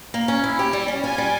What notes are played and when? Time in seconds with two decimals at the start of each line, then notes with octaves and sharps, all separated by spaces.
0.14 A#3
0.28 C#4
0.44 E4
0.59 G4
0.73 G3
0.88 C#4
1.03 F4 G#5
1.18 G3